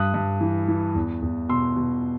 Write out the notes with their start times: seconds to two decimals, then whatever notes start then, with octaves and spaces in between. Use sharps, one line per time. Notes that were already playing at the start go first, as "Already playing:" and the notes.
Already playing: G2 D#6 F#6
0.14 G2
0.41 E3
0.68 E3
0.95 E2
1.22 E2
1.49 B2 C6 E6
1.76 B2